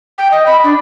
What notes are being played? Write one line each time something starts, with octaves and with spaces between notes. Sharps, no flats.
G5
D#5
B5
D4